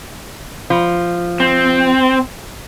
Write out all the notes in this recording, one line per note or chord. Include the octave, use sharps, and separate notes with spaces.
F3
C4